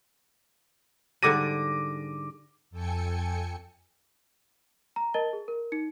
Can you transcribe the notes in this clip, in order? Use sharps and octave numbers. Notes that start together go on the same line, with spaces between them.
G#2 D3 G3 D6 A#6 D#7
F2 A4 G5 G#5 C#7
A#5
A#4 D#5 A5 A6 G7
G#4
A#4
D#4 C#7